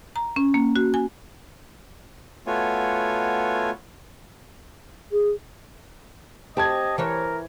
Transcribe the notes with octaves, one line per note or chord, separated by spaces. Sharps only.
A#5
C#4
A#3
F#4
G#5
A3 B3 F4 F#4 C#5 G#5
G#4
C4 G4 D#5 A5 G#6
E3 A#4 C5 C#5